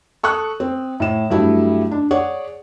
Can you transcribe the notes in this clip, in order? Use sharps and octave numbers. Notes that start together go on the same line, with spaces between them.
A4 C#6 D#6 F#6
C4
A2 E7
G2 F#3 G3 A3 E4
D4
G#4 C#5 D5 F#5